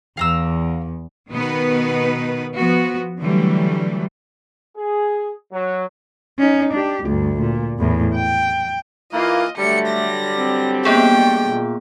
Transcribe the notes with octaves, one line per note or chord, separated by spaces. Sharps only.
E2 F5 A#5 E6
B2 D#3 B3 D#4 B4
F3 B3 F#4
D3 E3 F#3 G3 A3
G#4
F#3
C#4 D#4
D4 G4
D2 G2
A#2
E2 A2
G5
E3 A#3 F4 D#5
D3 F#3 G3 A3 C#7
A#6
C4
A#3 B3 G#4 G5
A#2